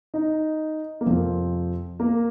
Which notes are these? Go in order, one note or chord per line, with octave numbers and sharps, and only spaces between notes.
D#4
A#3
F2 C3 F3 C4
A#3